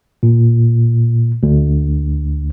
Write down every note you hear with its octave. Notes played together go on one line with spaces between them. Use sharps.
A#2
D2